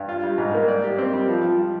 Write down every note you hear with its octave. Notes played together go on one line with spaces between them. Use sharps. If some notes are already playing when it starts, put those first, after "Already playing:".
Already playing: G2
F4
G3
G#2
A#3
D5
G4
C4
G3
F3
F3
F3